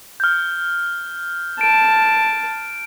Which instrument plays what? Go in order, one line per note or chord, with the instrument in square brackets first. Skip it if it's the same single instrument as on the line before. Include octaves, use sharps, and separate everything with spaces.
[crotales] F6 G6
[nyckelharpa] A5 [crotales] D7